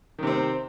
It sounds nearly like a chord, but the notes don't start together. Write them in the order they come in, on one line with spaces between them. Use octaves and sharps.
D#3 C3 C4